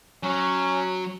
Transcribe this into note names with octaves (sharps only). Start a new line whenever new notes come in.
F#3 C#4